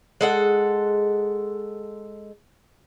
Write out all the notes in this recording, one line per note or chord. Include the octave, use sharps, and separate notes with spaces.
G#3 A4 F#5